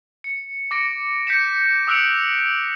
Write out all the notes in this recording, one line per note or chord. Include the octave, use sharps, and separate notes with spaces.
C#7
D6 A#6 C#7 D7
G6 B6 C#7 E7
D#6 E6 F#6 C#7 D7 F7